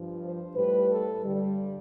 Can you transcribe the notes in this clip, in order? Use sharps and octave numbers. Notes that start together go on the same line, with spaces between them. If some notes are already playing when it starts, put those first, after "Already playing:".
Already playing: G2 F3
C5
A2 G3 B4
A4
G2 D3 G3